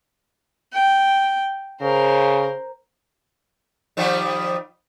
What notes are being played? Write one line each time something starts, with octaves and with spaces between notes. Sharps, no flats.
G5
C#3 A#4 C5
D#3 F3 G3